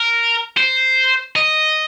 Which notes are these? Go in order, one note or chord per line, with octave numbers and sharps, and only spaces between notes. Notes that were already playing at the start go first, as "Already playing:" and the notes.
Already playing: A#4
C5
D#5